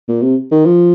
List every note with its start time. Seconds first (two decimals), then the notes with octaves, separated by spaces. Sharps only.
0.08 A#2
0.22 C3
0.52 D#3
0.66 F3